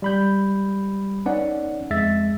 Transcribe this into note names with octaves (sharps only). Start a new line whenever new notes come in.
G3 B5 G6
B3 C#4 D#4 D5 F#5
F2 G#3 E5 A6